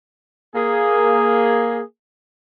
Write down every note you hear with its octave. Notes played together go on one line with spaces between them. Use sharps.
A#3 G#4